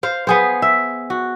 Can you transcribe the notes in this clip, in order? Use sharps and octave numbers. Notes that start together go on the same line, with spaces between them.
C5 F5
B3 G#4 C5
E5
F#4